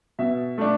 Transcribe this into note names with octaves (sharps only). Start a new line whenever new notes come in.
B2 E5
A3 D4